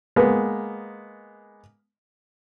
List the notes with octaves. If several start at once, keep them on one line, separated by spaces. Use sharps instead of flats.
G#3 A#3 B3